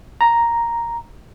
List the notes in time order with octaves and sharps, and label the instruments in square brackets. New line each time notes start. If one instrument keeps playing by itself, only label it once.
[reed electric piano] A#5